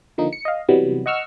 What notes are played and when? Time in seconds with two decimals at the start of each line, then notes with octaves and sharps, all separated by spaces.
0.18 D3 F3 A#3 D#4
0.33 C#7
0.45 D#5 F5
0.69 C3 E3 F#3 G3 B3
1.06 D#5 F#5 C#6 E6 F6